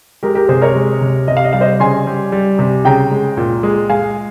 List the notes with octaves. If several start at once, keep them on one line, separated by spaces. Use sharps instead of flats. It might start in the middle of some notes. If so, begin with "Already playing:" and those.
G#3 G4 A#4
G4 A#4
C3 G#4 C5
A#4 C#5
G#3
C3
C3 D#5
F5
D#5
G3 F5
C5 D#5
C#3 G#5 C6
G3
G3
C3
C#3 G5 A#5
G#3
A#2
G#3
G#3 F5 G#5